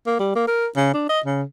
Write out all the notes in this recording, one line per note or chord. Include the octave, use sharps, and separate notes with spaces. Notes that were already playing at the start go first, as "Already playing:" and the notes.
A#3
G3
A#3
A#4
C#3
D4
D#5
C#3